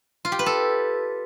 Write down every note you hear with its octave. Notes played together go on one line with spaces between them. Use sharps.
F4
G4
B4
A4